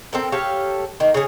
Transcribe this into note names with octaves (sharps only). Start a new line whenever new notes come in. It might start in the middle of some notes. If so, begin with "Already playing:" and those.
C4 A4 A#4
G4 A4 C#5 F5
D#3 A#3
C#3 C#4 G#4